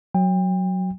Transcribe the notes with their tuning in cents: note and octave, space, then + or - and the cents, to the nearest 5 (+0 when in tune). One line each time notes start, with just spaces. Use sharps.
F#3 +0 G5 +30